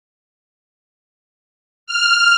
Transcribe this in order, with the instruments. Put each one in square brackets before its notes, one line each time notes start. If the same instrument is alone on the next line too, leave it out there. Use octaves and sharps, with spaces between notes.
[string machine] F6